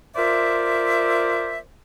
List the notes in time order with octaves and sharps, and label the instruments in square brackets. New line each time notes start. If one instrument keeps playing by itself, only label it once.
[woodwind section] F4 A#4 C5 D5 E5